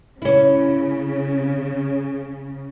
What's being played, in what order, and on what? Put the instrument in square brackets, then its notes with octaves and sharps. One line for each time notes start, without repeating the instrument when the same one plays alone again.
[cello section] C#3 [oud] C#4 E4